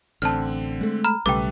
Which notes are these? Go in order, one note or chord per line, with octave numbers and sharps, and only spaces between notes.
A1 D3 C4 A5 F6
G#3 A3
A#5 B5 F6
B1 C#3 G3 A3 A4 B4 G5 D6